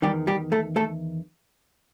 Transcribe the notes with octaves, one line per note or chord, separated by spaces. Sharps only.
E2 D#3 G3 G4
G3 G4
A3 A4
A3 A4